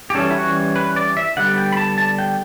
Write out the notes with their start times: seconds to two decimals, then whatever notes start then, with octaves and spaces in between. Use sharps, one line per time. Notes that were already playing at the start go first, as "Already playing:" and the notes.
0.10 G4
0.15 E3 G3 C#4 A4
0.31 E4
0.35 F#4
0.76 B4
0.96 D5
1.17 E5
1.37 D3 G3 B3 F#5
1.58 G5
1.72 B5
1.77 A5
1.98 A5
2.19 G5